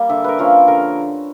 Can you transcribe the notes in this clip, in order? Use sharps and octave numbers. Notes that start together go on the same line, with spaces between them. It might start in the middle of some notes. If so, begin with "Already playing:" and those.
Already playing: G3 A#3
D3 E5
A#4 B4
F3 A#3 C#4
D3 A#4